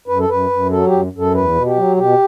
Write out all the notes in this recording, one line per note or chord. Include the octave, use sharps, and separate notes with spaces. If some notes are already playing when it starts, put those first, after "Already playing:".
F#2 B4
A4
F#2 B4
F#2
F#3 A4
G4
F#2
F#2
A4
E2 B4
B2
G4
F#3
B2 G4